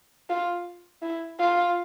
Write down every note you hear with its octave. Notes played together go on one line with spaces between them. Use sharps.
F4
E4
F4